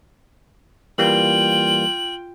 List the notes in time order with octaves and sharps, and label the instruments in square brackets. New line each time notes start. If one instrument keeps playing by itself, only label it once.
[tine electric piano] E3 G3 A#3 [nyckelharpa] F4 G5 [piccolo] F#7